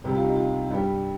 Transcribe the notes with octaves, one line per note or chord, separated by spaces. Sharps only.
C2 C3 G3 G4
F4
D#4
F4
G2 G3 G4